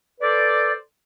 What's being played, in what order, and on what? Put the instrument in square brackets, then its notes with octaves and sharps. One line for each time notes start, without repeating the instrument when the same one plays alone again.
[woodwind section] A4 B4 C5 D5